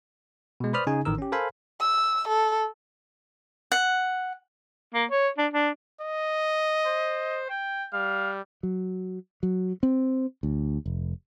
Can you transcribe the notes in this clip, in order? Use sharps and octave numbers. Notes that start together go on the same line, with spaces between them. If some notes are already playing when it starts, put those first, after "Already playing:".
B2 G#3
B4 C5 D5 B5 D#6 F6
C#3 D#4 G#4 G#5
A1 D#3 A#4 E6
C#4 G4
A4 A#4 C5 F5 G#5 B5
E6
A4
F#5
A#3
C#5
D4
D4
D#5
C5
G5
G3 F5
F#3
F#3
C4
D2
F1